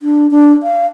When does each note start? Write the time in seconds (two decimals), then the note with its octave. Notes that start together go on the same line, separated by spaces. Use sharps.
0.01 D4
0.31 D4
0.63 F5